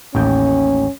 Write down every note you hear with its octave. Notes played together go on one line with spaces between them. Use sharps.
A1 D#2 C#4 G5